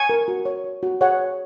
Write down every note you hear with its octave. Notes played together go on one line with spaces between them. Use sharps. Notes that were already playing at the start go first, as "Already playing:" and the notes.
Already playing: G#5 C#6
A#4
F#4
C#5
C#5
F#4
G#4 C#5 F#5
G#4